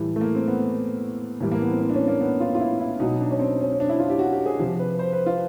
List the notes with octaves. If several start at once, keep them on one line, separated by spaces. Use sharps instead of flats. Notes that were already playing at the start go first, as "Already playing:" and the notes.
Already playing: A2 E3 G3
A3
A#3
C4
B3
A2 E3 G3 A#3
A#3
B3
C4
C4
D4
C#4
A#3
B3
F4
F4
E4
E4
B2 F#3 D#4
D4
C#4
C4
C#4
C#4
D4
E4
F4
G4
F#4
G4
G#4
C3 F3 G4
B4
C5
B4
F4